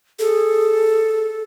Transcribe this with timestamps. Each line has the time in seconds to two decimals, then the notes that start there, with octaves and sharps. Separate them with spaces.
0.19 G#4 A4